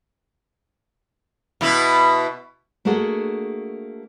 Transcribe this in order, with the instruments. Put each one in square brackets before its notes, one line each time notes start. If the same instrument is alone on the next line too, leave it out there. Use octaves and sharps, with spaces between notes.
[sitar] B2 E4 B4
[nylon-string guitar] A3 A#3 D4 F#4 G#4 A4